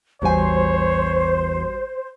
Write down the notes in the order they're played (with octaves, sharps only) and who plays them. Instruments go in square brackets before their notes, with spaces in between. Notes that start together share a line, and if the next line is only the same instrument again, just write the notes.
[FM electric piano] A1 G3 F#4 [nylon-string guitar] E2 G#5 [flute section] C5 [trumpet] C#5